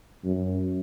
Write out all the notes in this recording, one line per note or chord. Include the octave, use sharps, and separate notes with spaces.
F#2